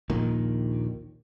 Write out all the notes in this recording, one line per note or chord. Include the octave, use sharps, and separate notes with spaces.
A#1 D#2 A#2 D#3